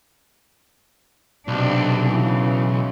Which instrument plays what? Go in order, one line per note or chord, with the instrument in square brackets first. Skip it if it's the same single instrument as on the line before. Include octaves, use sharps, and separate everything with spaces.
[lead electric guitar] B1 [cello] C3 D4
[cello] C#3 E3